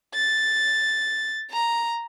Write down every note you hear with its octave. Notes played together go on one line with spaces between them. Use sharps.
A6
A#5